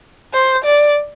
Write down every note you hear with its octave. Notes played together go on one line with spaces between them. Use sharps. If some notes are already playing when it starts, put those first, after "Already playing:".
C5
D5